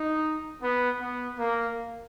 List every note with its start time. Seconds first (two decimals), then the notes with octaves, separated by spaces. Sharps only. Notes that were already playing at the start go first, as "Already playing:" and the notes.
Already playing: D#4
0.60 B3
1.00 B3
1.39 A#3